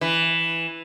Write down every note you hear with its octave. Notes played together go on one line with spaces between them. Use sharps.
E3